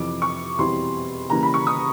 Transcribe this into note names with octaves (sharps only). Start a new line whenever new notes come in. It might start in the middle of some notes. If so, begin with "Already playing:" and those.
Already playing: F2 C3 E3 D6
C#6
E2 B2 G3 C4 E4 C6
C#3 E3 G3 A#3 C#4 A#5
B5
C#6
D#6